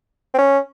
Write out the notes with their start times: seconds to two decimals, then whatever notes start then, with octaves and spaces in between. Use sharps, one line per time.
0.34 C4
0.38 C#4